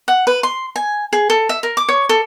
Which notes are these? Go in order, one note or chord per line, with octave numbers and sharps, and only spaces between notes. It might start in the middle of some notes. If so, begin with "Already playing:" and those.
F#5
B4
C6
G#5
G#4
A4
E5
A#4
D6
C#5
A4